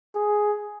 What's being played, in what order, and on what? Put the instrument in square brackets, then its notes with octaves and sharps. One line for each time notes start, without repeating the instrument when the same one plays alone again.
[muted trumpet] G#4